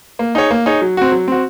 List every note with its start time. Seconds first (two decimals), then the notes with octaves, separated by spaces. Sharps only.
0.19 A#3
0.35 D#4 G#4 C#5
0.51 A#3
0.66 D#4 G#4 C#5
0.82 F#3
0.97 C4 F#4
1.12 F#3
1.28 C4 F#4